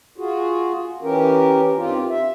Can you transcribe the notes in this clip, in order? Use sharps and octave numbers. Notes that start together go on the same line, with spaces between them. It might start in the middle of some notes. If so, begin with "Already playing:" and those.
F4 F#4 G#4
E3 C#4 G4 A#4
G2 D#3 C4 F4 G4
E5